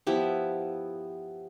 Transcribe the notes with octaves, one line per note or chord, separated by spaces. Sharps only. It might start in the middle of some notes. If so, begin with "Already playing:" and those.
F3 B3 E4 G4